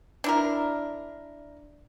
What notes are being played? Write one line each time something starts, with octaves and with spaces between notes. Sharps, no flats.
D4 E4 A#4